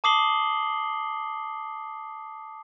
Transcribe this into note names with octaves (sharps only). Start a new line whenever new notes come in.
A5 D6 D#6 C7 F#7 G7